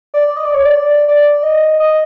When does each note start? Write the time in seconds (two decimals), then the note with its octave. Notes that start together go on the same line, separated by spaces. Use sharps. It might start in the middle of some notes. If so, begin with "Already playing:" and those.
0.14 D5
0.36 D#5
0.45 D5
0.54 C#5
0.64 D5
1.08 D5
1.43 D#5
1.80 D#5